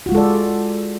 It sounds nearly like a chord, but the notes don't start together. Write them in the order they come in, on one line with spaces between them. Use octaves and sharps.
F#4 F4 G#3 A4 D5